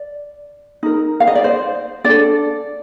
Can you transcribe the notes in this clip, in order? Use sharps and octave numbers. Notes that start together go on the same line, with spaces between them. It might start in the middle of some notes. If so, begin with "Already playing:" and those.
Already playing: D5
D#4 A#4
F5
D#5
D5
C5
D4 A4 D5